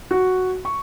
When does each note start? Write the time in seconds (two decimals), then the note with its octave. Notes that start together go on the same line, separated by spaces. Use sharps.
0.11 F#4
0.65 C#6